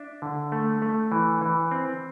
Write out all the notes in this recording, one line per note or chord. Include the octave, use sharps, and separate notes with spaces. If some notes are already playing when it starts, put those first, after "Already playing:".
Already playing: D4 E5
D3
A3
A3
E3
E3
C4